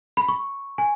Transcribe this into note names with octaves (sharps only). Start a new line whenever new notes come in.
B5
C#6
G#5